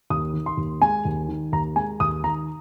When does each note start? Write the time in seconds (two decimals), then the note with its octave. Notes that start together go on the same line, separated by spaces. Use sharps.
0.10 D#2 D#6
0.33 D#3
0.46 C6
0.57 D#2
0.82 G#3 G#5
1.05 D#2
1.29 D#3
1.52 D#2 A#5
1.76 G#3 G#5
2.00 D#2 D#6
2.24 D#3 A#5